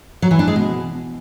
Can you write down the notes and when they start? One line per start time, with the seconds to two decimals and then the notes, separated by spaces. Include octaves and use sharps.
0.22 F#3
0.31 E3
0.39 D4
0.47 G#3
0.56 B2